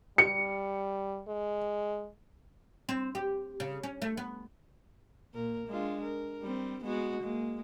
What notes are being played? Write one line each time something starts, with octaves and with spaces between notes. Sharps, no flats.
G3 C#7
G#3
C4
G4
C#3
C#4
A3
B3
A#2 A#4
G#3 D4 F4
A#4
G3 C4
G#3 B3 F#4
G#3 A#3